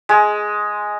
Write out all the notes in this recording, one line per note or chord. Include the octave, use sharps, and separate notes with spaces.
G#3